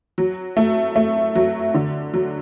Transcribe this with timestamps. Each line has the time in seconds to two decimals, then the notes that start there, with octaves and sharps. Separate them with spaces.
0.18 F#3
0.57 A3
0.96 A3
1.35 F#3
1.74 D3
2.14 F#3